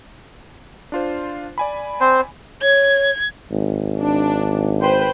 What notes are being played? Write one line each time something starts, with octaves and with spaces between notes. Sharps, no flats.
D4 F4 C5
D5 G#5 B5
C4 C5
C#5 G#6
G#1
D4
B4 C5 G5